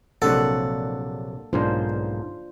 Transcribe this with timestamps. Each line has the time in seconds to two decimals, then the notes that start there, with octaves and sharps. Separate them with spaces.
0.22 A#1 C3 F#3 A#3 D4 A4 F#5
1.53 B1 G#2 A#3 D4 F4 C5